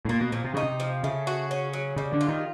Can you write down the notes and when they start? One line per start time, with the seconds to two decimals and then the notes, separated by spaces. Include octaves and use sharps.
0.05 A2
0.09 A#2 A#3
0.21 B2
0.32 A#2 F3
0.44 C3
0.54 C#3 D#4
0.63 C3
0.80 F3
1.04 C#3 A3
1.27 F#4
1.51 C#4
1.73 F#3
1.96 C#3 G3
2.13 D3
2.21 F4
2.28 D#3